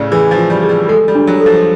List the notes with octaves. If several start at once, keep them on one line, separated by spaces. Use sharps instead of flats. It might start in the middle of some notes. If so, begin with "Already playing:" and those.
Already playing: A2 C#3 D5
E3 G#4
F3
F4
G3
G#4
G3
G#3 A4
G3
D4
F#3
A4
F3